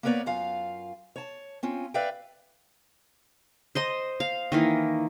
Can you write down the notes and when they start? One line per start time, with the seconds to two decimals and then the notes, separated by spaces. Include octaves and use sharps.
0.03 A#3 B3 A#4 B4 C#5 D5
0.26 F#2 F4 F5
1.16 C#5 A5
1.63 C4 C#4 F4
1.94 B4 D5 E5 F5 G5
3.75 C5 D#5 C6
4.20 F5
4.52 D#3 E3 A#3